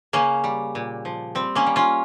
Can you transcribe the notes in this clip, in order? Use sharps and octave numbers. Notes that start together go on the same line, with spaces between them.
C#3 A#3 C#4
G3
A#2
F3
G3 C4
A#3 C#4
G3
C#4 F4